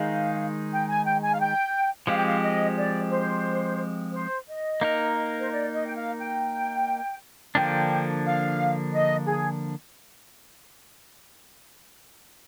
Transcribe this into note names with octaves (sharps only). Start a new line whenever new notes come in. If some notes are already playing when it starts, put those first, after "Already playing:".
Already playing: D#3 G#3 D#4 G#4 C5 F5
G5
G#5
G5
G#5
F5
G5
F3 G#3 C4 G4 F5
G5
F5
D#5
D5
C5
C5
D#5
A#3 D#4 A#4
C5
D5
D#5
G5
F5
G5
D3 F3 A#3 D4 G5
F5
D#5
G#4